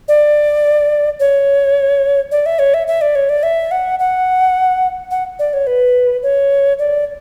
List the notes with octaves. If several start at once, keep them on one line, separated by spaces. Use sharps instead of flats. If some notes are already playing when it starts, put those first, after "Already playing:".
D5
C#5
D5
E5
C#5
E5
E5
D5
C#5
D5
E5
F#5
F#5
F#5
D5
C#5
B4
C#5
D5